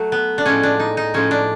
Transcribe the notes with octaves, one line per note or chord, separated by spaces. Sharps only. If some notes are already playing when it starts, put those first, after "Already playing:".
Already playing: F#3 A3
B3
D4
A2 F3 G#3 C#4
D4
D#4
D#4
A2 F3 G#3 C#4
D4